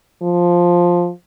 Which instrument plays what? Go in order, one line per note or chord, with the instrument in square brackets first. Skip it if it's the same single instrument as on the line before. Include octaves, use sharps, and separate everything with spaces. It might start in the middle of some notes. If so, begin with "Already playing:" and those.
[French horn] F3